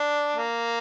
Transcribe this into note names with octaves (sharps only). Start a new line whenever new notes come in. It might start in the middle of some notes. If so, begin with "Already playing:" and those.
Already playing: D4
A#3